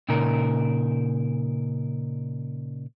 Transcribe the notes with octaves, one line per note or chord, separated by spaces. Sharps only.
A#2 C#3 D#4 A#4